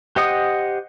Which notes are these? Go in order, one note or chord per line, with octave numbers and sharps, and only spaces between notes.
G4 C5 D#5 F#5 D#6